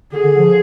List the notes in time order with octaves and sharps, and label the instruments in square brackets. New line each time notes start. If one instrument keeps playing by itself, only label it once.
[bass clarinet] D3 [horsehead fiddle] G#4
[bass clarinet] D3
F3